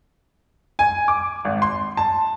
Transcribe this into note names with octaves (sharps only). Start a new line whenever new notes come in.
G#5
D6
G#1
C6
A5